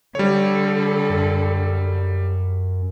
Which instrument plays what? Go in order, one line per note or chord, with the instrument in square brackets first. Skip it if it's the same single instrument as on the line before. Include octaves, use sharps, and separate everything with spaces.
[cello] D3 A4 [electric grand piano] G3 C#5
[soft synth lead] F#2